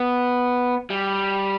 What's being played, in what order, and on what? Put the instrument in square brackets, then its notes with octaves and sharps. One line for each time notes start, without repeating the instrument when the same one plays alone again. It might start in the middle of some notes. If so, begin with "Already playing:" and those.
Already playing: [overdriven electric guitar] B3
G3